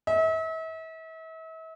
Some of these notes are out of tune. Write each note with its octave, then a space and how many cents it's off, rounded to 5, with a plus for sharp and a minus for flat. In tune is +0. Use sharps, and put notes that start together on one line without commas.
E5 -40